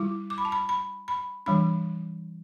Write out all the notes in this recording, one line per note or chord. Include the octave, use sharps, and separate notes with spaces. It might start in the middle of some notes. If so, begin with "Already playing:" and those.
Already playing: G3 E4 D6
D6
B5
A5
B5
B5
B5
E3 G3 D4 B5